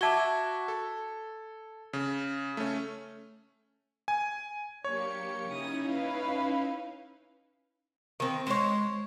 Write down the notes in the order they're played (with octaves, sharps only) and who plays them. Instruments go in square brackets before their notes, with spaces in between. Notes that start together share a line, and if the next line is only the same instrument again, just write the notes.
[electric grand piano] F#4 E5 D6 [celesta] A5 G#6 G7
[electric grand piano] A4
C#3
A3 C#4
G#5
[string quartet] F#3 D4 [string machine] A#3 G4 C#7 [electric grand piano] C#5
[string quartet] C#3 D#6 [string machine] C#4 D#4 E4
[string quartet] B4 F5
[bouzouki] D#3 C4
[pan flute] G#3 [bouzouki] C5 C#5